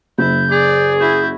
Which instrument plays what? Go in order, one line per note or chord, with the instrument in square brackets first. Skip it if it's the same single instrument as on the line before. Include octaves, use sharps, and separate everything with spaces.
[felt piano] F#1 [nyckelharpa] E4 [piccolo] G6
[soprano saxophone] G#4 [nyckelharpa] D5
[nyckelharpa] E4 F#4 [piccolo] G6